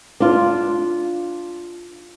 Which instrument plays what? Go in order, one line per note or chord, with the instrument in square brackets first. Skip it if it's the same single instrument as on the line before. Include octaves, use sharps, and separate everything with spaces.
[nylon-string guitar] D4 F4